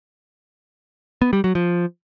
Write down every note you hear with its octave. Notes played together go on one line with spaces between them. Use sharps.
B3
G3
F#3
F3